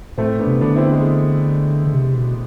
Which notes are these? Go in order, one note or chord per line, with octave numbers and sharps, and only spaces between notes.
A2 A3 C4
B3 D4
C3
D3 B3 D4
C4 E4
G#3
D3
C3
B2